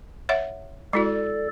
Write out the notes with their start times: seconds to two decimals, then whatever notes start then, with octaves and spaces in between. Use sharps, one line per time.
0.29 C#5 E5 F#5
0.93 G#3 E4 F#4 A4 D5